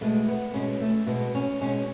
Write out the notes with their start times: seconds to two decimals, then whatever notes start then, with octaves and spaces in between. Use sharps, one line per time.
0.01 B2 G#3 A3
0.28 B3
0.54 B2 G#3 C#4
0.80 A3
1.07 B2 G#3 B3
1.35 C#4
1.61 B2 G#3 C#4